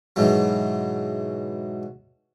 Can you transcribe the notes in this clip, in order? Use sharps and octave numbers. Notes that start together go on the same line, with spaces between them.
G#2 B2 E3 F#3